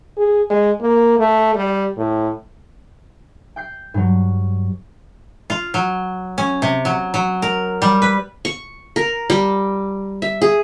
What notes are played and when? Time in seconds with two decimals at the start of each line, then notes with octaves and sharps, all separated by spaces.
0.17 G#4
0.50 G#3
0.81 A#3
1.19 A3
1.54 G3
1.97 A2
3.56 G5 G6 C7
3.94 G2 F#3
5.50 F4
5.74 F#3
6.38 C#4
6.62 C3
6.85 F#3
7.14 F#3
7.42 A#4
7.82 G3
8.02 B4
8.45 C#6
8.96 A#4
9.30 G3
10.22 E5
10.41 G#4